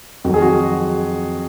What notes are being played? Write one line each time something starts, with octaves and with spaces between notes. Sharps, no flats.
F2 D#3 F#3 F#4
G#4
F#4